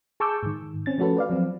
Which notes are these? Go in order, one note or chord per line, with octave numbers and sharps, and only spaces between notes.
G#4 A5 C#6 D6 E6 G6
G#2 D#3
C4 C#4 A6
F3 A3 C#4 F#4 A4 B4
B4 D5 F5
F3 F#3 C4